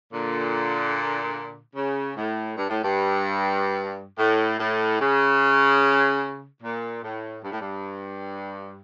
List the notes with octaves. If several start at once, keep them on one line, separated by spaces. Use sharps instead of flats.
A#2 D3
C#3
A2
G2
A2
G2
A2
A2
C#3
A#2
A2
G2
A2
G2